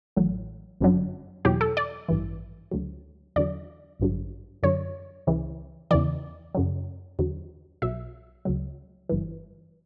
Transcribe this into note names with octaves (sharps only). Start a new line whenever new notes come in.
A1 A2 F#3
G1 F#2 D3 F#3
E2 B2 F#3 G4
A4
D5
A1 G2 E3
D2 D3 F#3
E2 D3 F#3 D5
A1 G2 D3 F#3
F#2 D3 F#3 C#5
C#2 C#3 E3
E2 C#3 E3 D5
F#2 C#3 F#3
E2 D3 F#3
B1 B2 F#3 E5
D2 C#3 F#3
G1 G2 E3